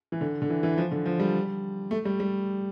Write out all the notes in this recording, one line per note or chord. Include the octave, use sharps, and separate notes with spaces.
E3
D3
D3
E3
E3
F3
D3
F3
G3
A3
G3
G3